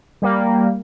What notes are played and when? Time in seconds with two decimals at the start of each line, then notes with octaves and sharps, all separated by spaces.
0.22 G3 A#3